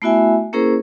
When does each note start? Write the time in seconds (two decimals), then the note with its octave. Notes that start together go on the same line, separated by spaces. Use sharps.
0.02 A3 B3 E4 F#4 E5 G#5
0.53 A#3 C#4 E4 G#4 A#4 C5